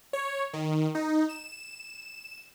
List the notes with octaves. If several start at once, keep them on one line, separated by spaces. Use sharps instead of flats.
C#5
D#3
D#4
E7